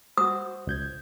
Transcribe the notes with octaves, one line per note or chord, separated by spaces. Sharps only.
F#4 C5 D#6
C#2 G6 G#6